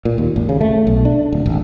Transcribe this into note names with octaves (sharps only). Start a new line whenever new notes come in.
A#2
D#2
G#1
C#3
A3
B1
D4
D1
G#1